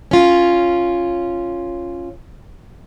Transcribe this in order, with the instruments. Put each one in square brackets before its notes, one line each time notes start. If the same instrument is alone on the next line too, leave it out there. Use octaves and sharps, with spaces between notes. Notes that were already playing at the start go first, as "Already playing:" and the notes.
[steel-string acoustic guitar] C#4 F4